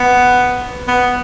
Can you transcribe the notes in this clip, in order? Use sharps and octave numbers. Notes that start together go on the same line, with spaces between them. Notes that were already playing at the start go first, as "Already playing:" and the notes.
Already playing: B3
B3